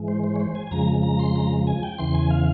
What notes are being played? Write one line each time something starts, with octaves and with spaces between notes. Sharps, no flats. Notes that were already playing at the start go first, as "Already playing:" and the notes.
Already playing: G#2 E3 G#3
C5
C5
C#5
C5
G#5
G#5
F2 C#3 F3 G#3 A#5
A#5
C6
A#5
G#5
G5
E2 C#3 E3 C6
G#5
F5